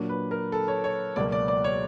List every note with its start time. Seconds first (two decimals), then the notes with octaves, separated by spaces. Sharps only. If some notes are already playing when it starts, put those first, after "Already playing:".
Already playing: A#2 F#3 A#3 D4
0.09 B4
0.31 A#4
0.52 A4
0.68 C#5
0.84 C#5
1.16 C#2 B2 F#3 A#3 D5
1.32 D5
1.48 D5
1.64 C#5